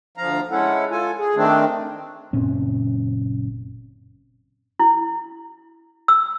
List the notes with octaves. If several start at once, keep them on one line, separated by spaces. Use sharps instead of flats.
D2 F3 F5 A#5
G#3 C#4 E4 A4 F#5
F4 A4 G#5
G#4
D#3 A3 C4 D4
F#1 A#2 C4 C#4
E4
E6